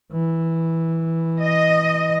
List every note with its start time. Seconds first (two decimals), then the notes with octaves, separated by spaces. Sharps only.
0.13 E3
1.41 D#5